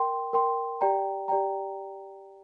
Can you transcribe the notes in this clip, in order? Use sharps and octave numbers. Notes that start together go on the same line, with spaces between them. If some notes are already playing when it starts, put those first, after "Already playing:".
Already playing: A#4 G5 C6
A#4 G5 C6
G4 D5 G5 A#5
G4 D5 G5 A#5